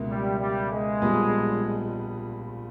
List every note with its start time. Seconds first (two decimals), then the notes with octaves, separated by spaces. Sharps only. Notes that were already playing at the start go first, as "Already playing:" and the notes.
Already playing: C#2 B2 A#3 E4
0.09 G3
0.39 G3
0.71 G#3
1.02 A#1 A#2 G3 B3